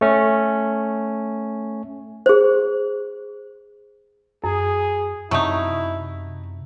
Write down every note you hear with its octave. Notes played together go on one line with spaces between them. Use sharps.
A3 C#4
G#4 C5
F#2 G#4
F#2 C3 F#3 A3 D#4 E4